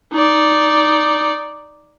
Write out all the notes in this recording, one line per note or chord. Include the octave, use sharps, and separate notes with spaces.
D#4 D5